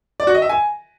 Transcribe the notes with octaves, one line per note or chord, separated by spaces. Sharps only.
D5
F#4
D#5
E5
G#5